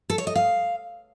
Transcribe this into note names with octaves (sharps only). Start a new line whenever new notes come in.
A4
C#5
D#5
F5